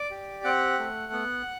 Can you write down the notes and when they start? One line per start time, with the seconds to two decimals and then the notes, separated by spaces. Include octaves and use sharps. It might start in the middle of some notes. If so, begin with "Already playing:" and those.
Already playing: D5 D6
0.11 G4
0.44 C4 F#5 F#6
0.79 A3
1.13 B3